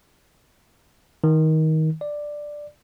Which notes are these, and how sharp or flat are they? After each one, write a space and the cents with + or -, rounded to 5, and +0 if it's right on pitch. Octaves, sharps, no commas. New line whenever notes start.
D#3 +20
D5 +5